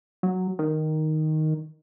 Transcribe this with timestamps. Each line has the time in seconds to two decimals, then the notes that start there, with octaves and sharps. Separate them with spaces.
0.23 F#3
0.59 D#3